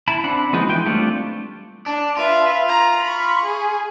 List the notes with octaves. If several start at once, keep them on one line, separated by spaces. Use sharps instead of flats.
E4 A5 B5
C4 D4 F#5 B5
F3 G#3 B3 D#4 F#4
E3 G5
G3 A3 C4 D4 F4
D4
F4 B4 E5
A#5
B5 C#6
G#4